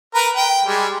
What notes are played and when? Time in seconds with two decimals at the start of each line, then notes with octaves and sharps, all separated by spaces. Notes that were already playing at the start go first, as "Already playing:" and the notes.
0.15 A#4 B4 A#5
0.36 G5
0.65 G3 G#3